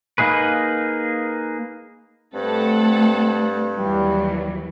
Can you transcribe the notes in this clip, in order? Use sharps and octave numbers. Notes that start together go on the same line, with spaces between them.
A#3 D#4 G#4 B4
G2 A3 C4 A4 F#5
D#2 E3 F#3 G3